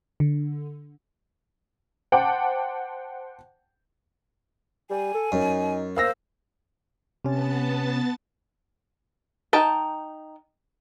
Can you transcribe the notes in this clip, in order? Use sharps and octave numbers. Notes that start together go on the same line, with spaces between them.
D3
C5 F#5 G5 A5 D6
G3 G#5
A4
F#2 D#4
A#3 C5 F5 E6 A#6
C3 B3 C#4 A5 A6
D#4 G5 A5